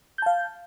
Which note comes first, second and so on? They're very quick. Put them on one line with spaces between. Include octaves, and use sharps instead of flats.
G6 A5 F5